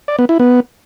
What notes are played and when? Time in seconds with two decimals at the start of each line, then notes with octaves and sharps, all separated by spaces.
0.08 D5
0.19 B3
0.29 E4
0.40 B3